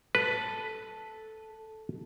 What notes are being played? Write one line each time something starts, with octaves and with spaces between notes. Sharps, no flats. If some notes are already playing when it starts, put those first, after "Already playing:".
A4 B4